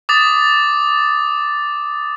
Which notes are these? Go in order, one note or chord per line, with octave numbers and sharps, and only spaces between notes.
D6 D#6 A6